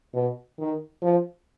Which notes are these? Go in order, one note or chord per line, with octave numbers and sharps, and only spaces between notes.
B2
D#3
F3